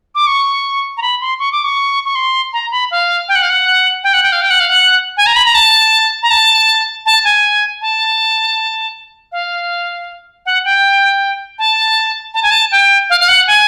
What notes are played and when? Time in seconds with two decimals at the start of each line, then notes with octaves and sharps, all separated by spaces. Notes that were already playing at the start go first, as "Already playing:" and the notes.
0.15 D6
0.27 C#6
0.97 A#5
1.02 B5
1.21 C6
1.39 C#6
1.52 D6
1.64 C#6
2.05 C#6
2.15 C6
2.53 A#5
2.72 B5
2.91 F5
3.29 G5
3.36 F#5
3.42 F5
3.50 F#5
4.04 G5
4.14 F#5
4.23 G5
4.32 F5
4.42 G5
4.51 F#5
4.60 F5
4.69 F#5
5.17 G#5
5.26 A#5
5.36 B5
5.45 A#5
5.55 A5
6.23 A#5
6.30 A5
7.06 A5
7.25 G#5
7.81 A5
9.32 F5
10.46 F#5
10.65 G5
11.59 A5
12.34 A5
12.43 G#5
12.51 A5
12.72 G5
13.10 F5
13.20 F5
13.29 F#5
13.47 G#5